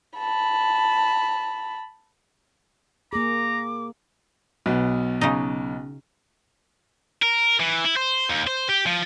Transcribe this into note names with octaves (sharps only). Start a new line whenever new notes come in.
A5 B5
A#3 G#4 A#5 D6
B1 B3
C#3 D#4
A#4
E3
E4
C5
D#2
C5
G4
F3